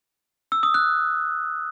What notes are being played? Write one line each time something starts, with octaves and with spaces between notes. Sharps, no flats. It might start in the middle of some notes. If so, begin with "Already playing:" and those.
E6
D#6
F#6